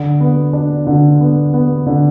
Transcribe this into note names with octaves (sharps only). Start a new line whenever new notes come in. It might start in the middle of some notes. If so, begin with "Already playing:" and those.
Already playing: D3
B3
D4
D3
B3
B3
D3